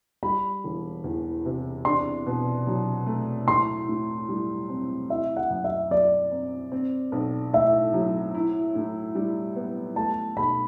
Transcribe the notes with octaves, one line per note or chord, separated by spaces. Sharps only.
G3 B5
E1
E2
C3
D4 C6
B2
F#3
A3
A2 C6
A2
G3
C4
E4 E5
F#5
F#2
E5
F#3 D5
C4
C4
B1
A2 E5
F#3
E4
A2
G3
B3
A3 A5
B1 B5